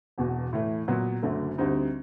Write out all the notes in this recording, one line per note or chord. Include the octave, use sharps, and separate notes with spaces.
E1 E2 B2
A2 E3 A3
A#2 F#3 B3
F#1 F#2 D3 F#3 A3
D2 D3 G3 C4 D#4